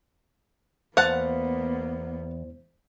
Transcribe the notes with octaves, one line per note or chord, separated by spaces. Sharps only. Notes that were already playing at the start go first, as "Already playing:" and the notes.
E2 A#3 B3 C5 F5 F#5 A5